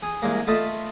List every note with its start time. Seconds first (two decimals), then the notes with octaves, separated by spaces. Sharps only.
0.03 G#4
0.22 C2 G#3 A#3
0.47 A3 F4 D#5 A5 B5 C6